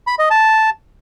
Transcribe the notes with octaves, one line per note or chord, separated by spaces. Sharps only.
B5
D#5
A5